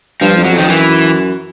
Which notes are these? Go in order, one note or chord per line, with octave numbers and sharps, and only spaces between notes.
G2 F3
F2
F#3
F2
D#3
F#2 E3